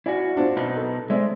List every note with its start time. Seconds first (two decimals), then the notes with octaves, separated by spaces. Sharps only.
0.06 E4 F#4 D5 G#5
0.36 C4 D4 F4
0.57 B2 D#4 B4
0.76 A4
1.10 G#3 C4 D5 E5